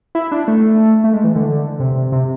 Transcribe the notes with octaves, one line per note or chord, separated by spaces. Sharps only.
E4
D4
A3
A3
G#3
E3
D3
C3
C3